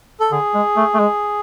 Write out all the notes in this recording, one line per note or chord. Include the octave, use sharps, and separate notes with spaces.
A4
D3 G#4
G#3
A3
A3
G#3